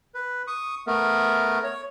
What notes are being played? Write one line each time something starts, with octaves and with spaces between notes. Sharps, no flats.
B4
C#6 D#6
A3 B3 A#4
C#5